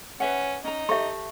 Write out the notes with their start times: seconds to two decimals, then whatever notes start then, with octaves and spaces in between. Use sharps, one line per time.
0.20 C#4 B4 E5 F#5
0.64 C#4 D#4 A#5
0.89 G4 A4 E5 C#6